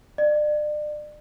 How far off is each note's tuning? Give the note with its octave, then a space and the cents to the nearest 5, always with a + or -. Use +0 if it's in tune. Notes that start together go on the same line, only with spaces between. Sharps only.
D5 +35